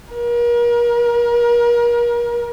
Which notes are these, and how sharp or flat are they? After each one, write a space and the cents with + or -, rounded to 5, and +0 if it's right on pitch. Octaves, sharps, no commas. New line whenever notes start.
A#4 +35